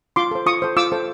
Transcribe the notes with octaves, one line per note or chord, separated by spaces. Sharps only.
F4 C6 D6
A4 C5
F4 C#6 D#6
A4 C5
F4 D6 E6
A4 C5